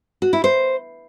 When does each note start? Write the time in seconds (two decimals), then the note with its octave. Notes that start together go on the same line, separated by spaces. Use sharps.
0.22 F#4
0.33 E4
0.44 C5